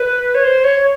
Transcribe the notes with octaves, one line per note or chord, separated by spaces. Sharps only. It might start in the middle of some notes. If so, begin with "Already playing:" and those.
Already playing: B4
C#5
C5
C#5